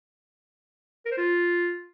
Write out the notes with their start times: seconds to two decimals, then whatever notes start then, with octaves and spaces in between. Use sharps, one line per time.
1.06 A#4
1.12 C5
1.17 F4